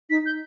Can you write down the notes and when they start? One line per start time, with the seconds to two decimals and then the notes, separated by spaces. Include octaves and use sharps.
0.10 D#4 B6
0.26 G6